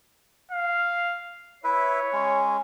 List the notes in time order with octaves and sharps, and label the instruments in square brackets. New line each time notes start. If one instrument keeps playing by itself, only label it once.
[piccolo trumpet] F5
[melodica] E4 B4 E5 [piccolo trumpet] C#5
[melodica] G#3 C#4